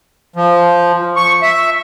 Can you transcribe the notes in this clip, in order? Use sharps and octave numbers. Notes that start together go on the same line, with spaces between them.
F3
C#6
E5